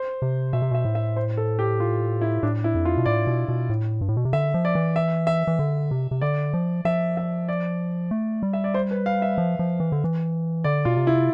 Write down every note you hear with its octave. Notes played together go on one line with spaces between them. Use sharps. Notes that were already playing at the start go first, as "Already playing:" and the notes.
Already playing: C5
C3
B2 E5
C3
B2 E5
A2
E5
C5
A4
G4
F4
E4
A2 D4
E4
F2
F4
B2
A2 D5
B2
B2
A2
G2
A2
B2
C3
D3 E5
F3
D5
E3
E5
E5
E3
D3
C3
C3
D3 D5
F3
F3 E5
E5
D5
A3
G3
E5
D5
C5
B4
F5
E5
F3
F3
E3
D3
E3
D3 D5
B2 F4
C3
E4